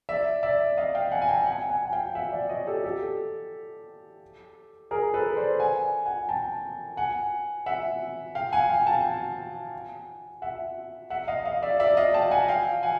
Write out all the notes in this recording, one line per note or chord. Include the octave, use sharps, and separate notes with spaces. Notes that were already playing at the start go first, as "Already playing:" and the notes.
D5 E5
D5 E5
D#5 F5
F5 G5
F#5 G#5
G#5
G5 A5
F#5 G#5
F#5 G#5
G#5
F5 G5
E5 F#5
D5 E5
C#5 D#5
G4 A4
G4 A4
G#4 A#4
A4 B4
C5 D5
F#5 G#5
F#5 G#5
G5 A5
F#5 G#5
E5 F#5
F5 G5
F#5 G#5
F5 G5
G5 A5
F#5 G#5
E5 F#5
E5 F#5
D#5 F5
D#5 F5
D5 E5
D5 E5
D#5 F5
G5 A5
F#5 G#5
F5 G5
F#5 G#5